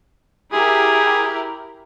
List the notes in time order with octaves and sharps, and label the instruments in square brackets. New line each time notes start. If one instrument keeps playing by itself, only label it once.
[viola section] E4 G4 A#4 [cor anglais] G#4